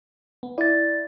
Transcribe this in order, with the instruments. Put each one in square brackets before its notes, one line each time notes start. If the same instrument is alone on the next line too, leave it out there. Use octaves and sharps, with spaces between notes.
[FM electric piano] B3
[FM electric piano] E4 [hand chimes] D5 A6